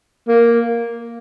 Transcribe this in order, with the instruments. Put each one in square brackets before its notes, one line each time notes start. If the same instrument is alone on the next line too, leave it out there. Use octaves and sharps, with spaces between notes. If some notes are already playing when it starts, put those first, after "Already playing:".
[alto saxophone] A#3